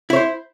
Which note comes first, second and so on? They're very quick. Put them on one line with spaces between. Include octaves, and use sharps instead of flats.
E4 C#5 C5